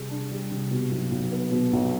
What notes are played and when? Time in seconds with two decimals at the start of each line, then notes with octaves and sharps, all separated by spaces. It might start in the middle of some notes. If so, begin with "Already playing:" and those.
Already playing: C3 G3 G#4
0.10 D4
0.31 G3
0.51 C3
0.71 B2
0.91 B1
1.11 B1
1.32 B3
1.52 B2
1.73 B1